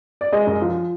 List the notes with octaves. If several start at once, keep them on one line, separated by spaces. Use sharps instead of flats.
D5
G#3 D#5
F#2
F3